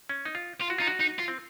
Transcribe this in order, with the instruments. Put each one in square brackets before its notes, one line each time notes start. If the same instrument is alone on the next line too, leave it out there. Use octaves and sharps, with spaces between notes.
[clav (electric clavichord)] C#4
D#4
F4
[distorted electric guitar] F4
[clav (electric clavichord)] F#4
[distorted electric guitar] D#4 [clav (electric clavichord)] F4
[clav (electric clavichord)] F#4
[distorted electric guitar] D#4
F4
[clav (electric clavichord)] C4